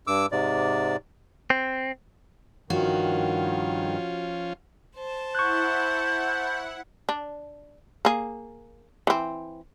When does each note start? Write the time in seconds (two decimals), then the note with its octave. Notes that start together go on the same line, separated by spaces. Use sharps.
0.07 G2 D6 E6
0.32 G#2 C3 D5
1.50 C4
2.70 G2 D#3 F3 C#4 F4 F#4
4.96 C5 A5
5.35 E4 F#5 C#6 F#6 G6
7.09 D4
8.05 A#3 G#4
9.07 E3 C4